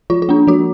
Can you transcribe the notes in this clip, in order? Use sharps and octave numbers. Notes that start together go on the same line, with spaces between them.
F3 F4
F4
A#3 D4
F3 F#4